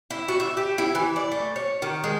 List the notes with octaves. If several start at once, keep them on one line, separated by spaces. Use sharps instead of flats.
E4
F#4
E5
G4
E4
E3
D5
A3
C#5
D#3
G#3